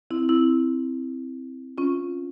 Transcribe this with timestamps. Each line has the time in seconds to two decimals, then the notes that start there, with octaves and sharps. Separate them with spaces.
0.11 C4 E4
0.29 C4 E4
1.78 C#4 F4